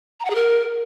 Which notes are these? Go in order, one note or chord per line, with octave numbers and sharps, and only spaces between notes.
A#5
F#5
G#4
A#4